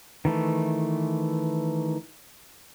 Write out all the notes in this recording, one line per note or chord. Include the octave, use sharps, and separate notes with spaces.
D#3 E3 A3